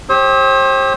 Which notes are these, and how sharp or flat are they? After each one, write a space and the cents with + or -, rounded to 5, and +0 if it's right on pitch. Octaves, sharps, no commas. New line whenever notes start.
G4 +0 C5 +40 E6 -45